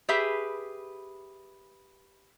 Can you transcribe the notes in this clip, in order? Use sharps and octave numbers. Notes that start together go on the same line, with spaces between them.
G4 G#4 B4 E5